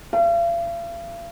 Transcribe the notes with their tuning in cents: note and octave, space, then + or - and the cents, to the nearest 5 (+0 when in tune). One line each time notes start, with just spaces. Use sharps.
F5 -45